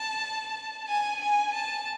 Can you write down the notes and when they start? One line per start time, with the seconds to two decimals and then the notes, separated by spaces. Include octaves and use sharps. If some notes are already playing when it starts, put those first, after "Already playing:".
Already playing: A5
0.88 G#5
1.21 G#5
1.54 A5